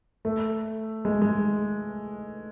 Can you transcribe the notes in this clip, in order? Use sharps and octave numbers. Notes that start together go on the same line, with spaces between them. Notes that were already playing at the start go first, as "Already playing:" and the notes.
A3
G#3
G#3